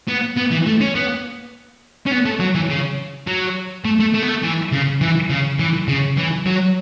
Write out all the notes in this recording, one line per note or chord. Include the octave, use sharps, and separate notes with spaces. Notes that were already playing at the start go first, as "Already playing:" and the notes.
B3
B3
E3
A3
C#4
B3
C#4
B3
A3
F#3
E3
C#3
F#3
A3
A3
A3
B3
A3
E3
C#3
E3
C#3
E3
C#3
E3
F#3